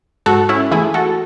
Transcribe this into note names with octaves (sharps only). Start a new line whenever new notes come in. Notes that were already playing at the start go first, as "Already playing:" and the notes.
G#2 F#4 A4
C#4 E4
E3 A3 E4 G#4
F#4 A4